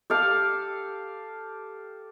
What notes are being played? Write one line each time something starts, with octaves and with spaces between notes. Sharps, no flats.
G4 A4 F5